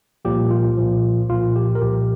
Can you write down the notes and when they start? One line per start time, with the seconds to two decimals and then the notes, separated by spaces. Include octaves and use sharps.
0.25 C2 A#2 F3 G4
0.51 F4
0.77 C2 A#2 F3
1.29 C2 A#2 F3 F4
1.56 G4
1.75 A#4
1.82 C2 A#2 F3 G4